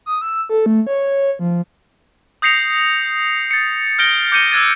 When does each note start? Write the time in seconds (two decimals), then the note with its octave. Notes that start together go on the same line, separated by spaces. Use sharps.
0.06 D#6
0.21 E6
0.49 A4
0.66 A3
0.87 C#5
1.39 F3
2.42 D#6 G6 A#6 C7 C#7 F7
3.51 A6 C#7
3.99 F6 G6 A#6 D7 G7
4.32 D6 G6 C#7 D#7 G7
4.51 E6 F#6 G#6 A6 D#7